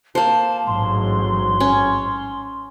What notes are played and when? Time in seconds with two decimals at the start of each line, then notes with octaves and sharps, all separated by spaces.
0.15 A#3 C5 A5
0.66 A1 G#2 F#3 C6
1.60 C#4